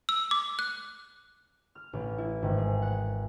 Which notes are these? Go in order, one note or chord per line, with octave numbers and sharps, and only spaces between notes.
E6
D6
F#6
F6
A1
E4
G#1
G#4
F#5